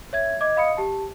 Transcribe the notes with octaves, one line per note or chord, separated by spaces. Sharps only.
C#5 E5 G#6
D#5 D6 G#6
D#5 F5 B5 D#6 C#7
G4 A5